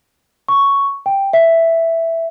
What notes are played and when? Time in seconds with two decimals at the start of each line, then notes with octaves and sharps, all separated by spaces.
0.48 C#6
1.06 G5
1.33 E5